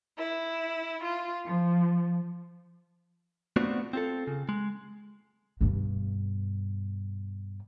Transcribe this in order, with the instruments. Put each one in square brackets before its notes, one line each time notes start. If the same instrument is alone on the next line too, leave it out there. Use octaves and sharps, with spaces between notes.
[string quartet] E4
F4
F3
[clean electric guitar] A3 B3 C4 D4 F4 F#4
C4 F4 A4
C#3
G#3
[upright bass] G2 B2